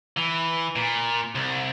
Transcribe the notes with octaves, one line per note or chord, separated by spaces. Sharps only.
E3
A#2
C2